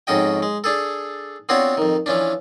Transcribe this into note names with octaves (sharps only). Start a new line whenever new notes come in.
F2 G#2 C#4 F#4 D#5 G5
G#3
D4 G#4 A4
B3 C4 D4 F4 F#4 C#5
F2 D#3
E3 F3 C#4 D4